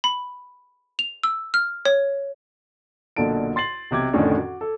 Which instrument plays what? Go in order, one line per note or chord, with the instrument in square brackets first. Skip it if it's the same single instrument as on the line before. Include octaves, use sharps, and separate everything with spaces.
[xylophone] B5
F7
E6
F6
C#5
[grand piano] B1 A#2 D3 A5 D7
C6 A6 C7 F#7
B1 C3 D6 G#6
F2 A2 D3 D#3 C#4 D4
F#4
A4